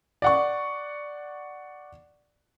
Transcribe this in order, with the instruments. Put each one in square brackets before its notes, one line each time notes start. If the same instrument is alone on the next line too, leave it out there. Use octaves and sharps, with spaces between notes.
[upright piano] D5 F#5 C#6